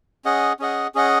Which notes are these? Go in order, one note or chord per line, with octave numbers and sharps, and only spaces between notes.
C#4 G#4 D#5 F#5
C#4 G#4 D#5 F#5
C#4 G#4 D#5 F#5